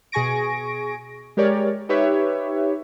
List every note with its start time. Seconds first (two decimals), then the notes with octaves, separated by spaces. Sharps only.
0.12 B2 G#4 G#5 C#6 A#6 D7
1.37 G#3 G4 A#4 C#5 D5
1.89 D#4 G4 B4 C#5 E5